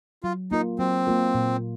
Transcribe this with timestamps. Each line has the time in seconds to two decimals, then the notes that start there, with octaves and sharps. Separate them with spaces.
0.23 F#3 F4
0.51 A#3 D#4 F4 A#4
0.79 F#3 C4
1.07 A#3 F4 A#4
1.35 A#2